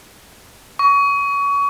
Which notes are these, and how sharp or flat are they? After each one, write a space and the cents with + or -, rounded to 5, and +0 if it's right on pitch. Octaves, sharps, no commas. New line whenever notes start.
C#6 +30